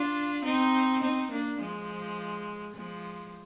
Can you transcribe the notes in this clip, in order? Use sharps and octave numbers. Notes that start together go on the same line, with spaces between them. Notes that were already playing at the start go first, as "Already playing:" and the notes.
Already playing: D4 F4
C4 D#4
C4 D#4
A#3 D4
F3 G#3
F3 G#3